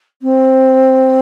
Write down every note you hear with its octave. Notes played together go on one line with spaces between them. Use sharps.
C4